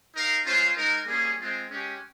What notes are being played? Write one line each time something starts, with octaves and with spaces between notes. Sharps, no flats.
D#4 A#4 F5
G#3 C#4 F4 C5 F5
G#3 D#4 A#4
G3 A#3 C#4 G#4
G#3 C4 F4
G#3 C#4 G4